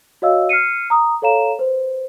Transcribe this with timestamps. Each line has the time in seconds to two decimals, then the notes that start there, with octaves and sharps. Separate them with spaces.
0.22 F#4 C#5 D#5 F5 E6
0.49 F6 C7 C#7 D#7
0.90 A#5 D#6
1.22 A4 C#5 F5 A#5 E7
1.59 B4 C5